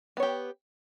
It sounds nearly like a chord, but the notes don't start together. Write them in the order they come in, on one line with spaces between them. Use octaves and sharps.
B3 C#5 G4